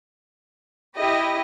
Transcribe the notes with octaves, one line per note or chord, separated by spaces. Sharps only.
E4 G4 D#5